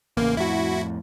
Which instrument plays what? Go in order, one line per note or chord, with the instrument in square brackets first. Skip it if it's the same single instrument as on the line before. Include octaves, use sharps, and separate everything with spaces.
[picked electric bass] A1 C#3 [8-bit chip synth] A#3
[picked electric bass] F2 A2 [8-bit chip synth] E4 F#4